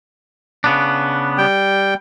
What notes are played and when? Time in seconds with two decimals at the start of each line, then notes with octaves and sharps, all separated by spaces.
0.64 C#3 B3 D4
1.38 G3 G5